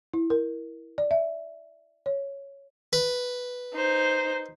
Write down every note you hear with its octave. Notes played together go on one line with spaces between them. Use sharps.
E4
A#4
D5
E5
C#5
B4
D#4 C5